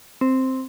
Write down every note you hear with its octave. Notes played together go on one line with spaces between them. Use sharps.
C4